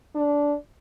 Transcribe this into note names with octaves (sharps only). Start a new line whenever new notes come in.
D4